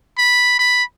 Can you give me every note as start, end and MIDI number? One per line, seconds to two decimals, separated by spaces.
0.18 0.58 83
0.59 0.83 83